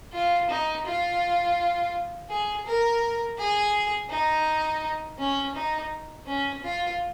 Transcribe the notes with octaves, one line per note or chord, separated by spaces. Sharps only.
F4
D#4
F4
G#4
A#4
G#4
D#4
C#4
D#4
C#4
F4